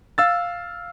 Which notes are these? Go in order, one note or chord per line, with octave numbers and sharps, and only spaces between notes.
F5 E6 A6